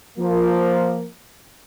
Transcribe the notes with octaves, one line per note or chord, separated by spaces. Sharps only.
F3 A#3